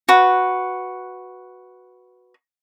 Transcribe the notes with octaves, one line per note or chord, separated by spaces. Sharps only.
F#4 B4